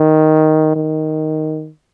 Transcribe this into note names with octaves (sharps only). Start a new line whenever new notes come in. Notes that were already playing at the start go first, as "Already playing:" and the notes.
Already playing: D#3
D#3